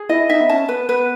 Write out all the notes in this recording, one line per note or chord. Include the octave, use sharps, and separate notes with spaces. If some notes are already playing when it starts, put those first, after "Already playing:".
Already playing: G#4
E4 D#5
D#4 E5
B3
C#4 A5
B3 B4
B3 B4